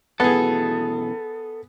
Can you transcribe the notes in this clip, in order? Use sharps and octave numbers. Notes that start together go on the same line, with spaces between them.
F#2 B2 E3 B3 G#4 A4